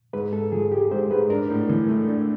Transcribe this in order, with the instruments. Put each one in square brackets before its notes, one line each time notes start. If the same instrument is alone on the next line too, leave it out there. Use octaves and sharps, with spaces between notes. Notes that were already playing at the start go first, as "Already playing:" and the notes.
[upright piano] G#2 [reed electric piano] B4
[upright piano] G#2 [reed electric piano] A4
[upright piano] F3 [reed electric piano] G#4
[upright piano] G#3 [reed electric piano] G4
[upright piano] G#2 [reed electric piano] C5
[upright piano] G#2 [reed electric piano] B4
[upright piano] D4 [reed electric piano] A#4
[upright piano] A2
E3
A3
D4